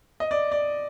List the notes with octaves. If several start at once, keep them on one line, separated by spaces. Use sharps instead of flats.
D#5
D5
D5